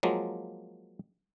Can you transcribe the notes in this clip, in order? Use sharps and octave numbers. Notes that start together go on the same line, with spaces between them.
F3 F#3 G#3 A#3